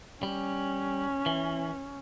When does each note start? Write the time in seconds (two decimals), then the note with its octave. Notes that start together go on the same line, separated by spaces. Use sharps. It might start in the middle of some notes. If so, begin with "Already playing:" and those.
0.23 G3 C#4
1.26 E3